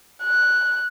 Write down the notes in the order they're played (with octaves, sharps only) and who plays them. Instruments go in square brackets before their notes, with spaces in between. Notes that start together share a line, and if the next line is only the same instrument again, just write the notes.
[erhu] F#6